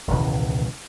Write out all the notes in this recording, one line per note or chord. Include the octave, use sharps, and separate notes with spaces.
E1 C#2 A2 D#3